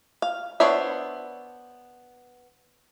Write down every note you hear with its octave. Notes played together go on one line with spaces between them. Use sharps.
F5
B3 D4 C5 C#5 E5